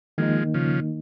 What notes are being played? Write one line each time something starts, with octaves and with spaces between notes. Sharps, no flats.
D#3 F3 G#3 A#3 D#4
C#3 F3